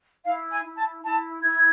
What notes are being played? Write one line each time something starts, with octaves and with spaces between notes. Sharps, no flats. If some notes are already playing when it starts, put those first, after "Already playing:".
E4 F5
G#5
E4
A5
E4 A5
E4 G#6